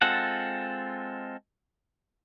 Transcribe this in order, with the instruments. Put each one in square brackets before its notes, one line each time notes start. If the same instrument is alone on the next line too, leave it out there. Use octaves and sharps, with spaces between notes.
[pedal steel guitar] G#3 C4 F4 A4 F#5